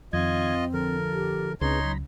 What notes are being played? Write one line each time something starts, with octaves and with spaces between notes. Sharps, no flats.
F2 D#3 C4 F4 D#5 G#6
D3 F3 A4 A#4
G4
C#2 C4 D4 D#4 G#4 B4 C#5 C6
F#3 A#5 B5